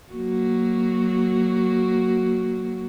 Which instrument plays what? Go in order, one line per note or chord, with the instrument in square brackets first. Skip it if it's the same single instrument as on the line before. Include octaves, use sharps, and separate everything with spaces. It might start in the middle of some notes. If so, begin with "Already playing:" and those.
[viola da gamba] F#3 A#3 F#4